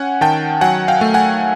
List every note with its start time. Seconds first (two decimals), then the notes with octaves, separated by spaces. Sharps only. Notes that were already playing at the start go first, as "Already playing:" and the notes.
Already playing: C#4 F#5 G#5
0.21 D#3 G5 A5
0.61 F#3 F#5 G#5
0.88 F5 G5
1.01 A3
1.14 F#5 G#5